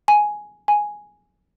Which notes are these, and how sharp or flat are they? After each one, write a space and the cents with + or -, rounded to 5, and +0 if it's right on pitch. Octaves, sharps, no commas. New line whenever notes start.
G#5 +5
G#5 +0